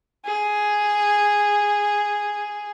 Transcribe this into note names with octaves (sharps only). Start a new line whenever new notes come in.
G#4